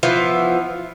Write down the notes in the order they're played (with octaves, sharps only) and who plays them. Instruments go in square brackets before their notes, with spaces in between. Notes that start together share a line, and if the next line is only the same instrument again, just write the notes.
[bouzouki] E3 F3 B3